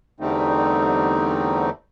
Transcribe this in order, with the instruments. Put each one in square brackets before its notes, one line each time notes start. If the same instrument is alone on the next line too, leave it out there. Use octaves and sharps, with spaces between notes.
[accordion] E2 D3 G3 A3 C4 D#4